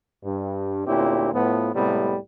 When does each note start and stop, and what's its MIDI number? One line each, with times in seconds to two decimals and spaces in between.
0.24 0.85 43
0.87 1.32 38
0.87 1.32 46
0.87 1.32 60
0.87 1.32 61
0.87 1.32 64
0.87 1.32 67
1.33 1.74 45
1.33 1.74 53
1.33 1.74 59
1.74 2.17 36
1.74 2.17 45
1.74 2.17 48
1.74 2.17 55
1.74 2.17 56
1.74 2.17 59